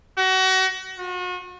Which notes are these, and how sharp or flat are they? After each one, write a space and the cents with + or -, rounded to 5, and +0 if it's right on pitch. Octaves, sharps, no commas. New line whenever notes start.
F#4 +30
F#4 -40